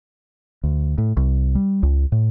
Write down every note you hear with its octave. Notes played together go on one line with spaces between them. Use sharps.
D2
A2
C2
G3
C#2
A2